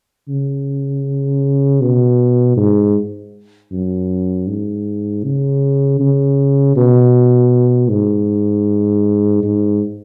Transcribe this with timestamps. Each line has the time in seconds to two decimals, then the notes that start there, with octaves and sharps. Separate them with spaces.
0.28 C#3
1.81 B2
2.57 G#2
3.71 F#2
4.47 G#2
5.24 C#3
6.00 C#3
6.76 B2
7.90 G#2
9.43 G#2